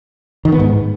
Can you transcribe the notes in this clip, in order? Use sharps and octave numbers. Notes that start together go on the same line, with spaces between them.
D#3
B3
G#2